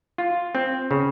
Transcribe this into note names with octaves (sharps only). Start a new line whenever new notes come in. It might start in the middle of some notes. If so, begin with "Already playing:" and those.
F4
C4
C#3